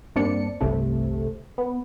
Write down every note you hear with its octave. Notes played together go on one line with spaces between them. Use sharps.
G2 A#3 C4 D4 D5 C#7
G1 C2 C3 A3
B3